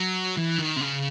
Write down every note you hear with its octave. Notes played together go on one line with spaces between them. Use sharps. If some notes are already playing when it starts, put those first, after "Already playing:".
Already playing: F#3
E3
D#3
C3
C#3